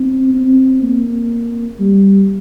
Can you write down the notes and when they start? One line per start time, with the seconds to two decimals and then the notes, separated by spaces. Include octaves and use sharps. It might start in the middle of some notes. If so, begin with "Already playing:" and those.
Already playing: C4
0.34 C4
0.82 A#3
1.80 G3